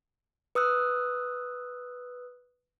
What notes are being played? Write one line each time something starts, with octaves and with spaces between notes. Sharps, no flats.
B4 D#6 E6 F#6